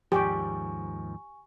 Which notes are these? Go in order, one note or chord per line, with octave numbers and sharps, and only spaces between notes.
D#2 G#2 F3 G4 G#5 C#6